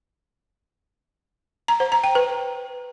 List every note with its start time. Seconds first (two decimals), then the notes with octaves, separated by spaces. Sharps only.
1.68 A#5
1.80 C5
1.92 A#5
2.04 G5
2.15 B4